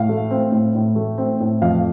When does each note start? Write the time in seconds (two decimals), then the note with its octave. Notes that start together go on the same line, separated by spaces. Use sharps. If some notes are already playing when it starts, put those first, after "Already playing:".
Already playing: A2 F5
0.09 A3
0.31 C4
0.52 A2
0.75 A2
0.96 A3
1.18 C4
1.40 A2
1.61 F2 F5